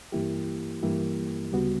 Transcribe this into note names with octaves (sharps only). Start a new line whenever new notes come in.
G2 E3 A#3 E4 G4
G2 E3 A#3 E4 G4
D2 C#3 G3 B3 F#4